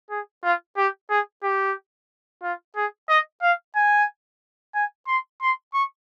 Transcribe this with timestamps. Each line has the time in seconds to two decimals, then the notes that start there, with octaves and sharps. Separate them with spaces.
0.10 G#4
0.43 F4
0.77 G4
1.10 G#4
1.43 G4
2.42 F4
2.76 G#4
3.09 D#5
3.42 F5
3.75 G#5
4.75 G#5
5.07 C6
5.42 C6
5.74 C#6